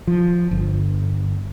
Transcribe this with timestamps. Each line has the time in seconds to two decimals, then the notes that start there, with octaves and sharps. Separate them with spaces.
0.07 F3
0.51 G1